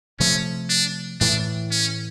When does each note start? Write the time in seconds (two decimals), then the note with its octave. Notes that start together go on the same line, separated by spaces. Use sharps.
0.20 C3 F3 A3 C#4
0.69 D4
1.20 A2 E3 A3 D4
1.71 C#4